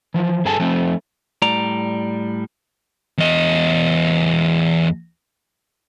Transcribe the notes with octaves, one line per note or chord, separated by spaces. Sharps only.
E3 F3
G2 G#4 A4 G#5 A5
F3 A3 C4
A2 G3 D5 A#5
E2 D#5